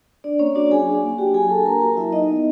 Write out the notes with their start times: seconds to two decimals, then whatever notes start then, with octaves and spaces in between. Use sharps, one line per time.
0.24 D4 D5
0.39 A#3 C#4 C#5
0.55 D4 F#4 D5
0.71 F#3 G#4 G#5
0.88 D4
1.03 A#3
1.18 F#4 G4 G5
1.34 F#3 G#4 G#5
1.50 D4 A4 A5
1.65 A#3 A#4 A#5
1.81 F#4 A#4 A#5
1.97 F#3 E4 E5
2.13 D#4 D#5
2.28 B3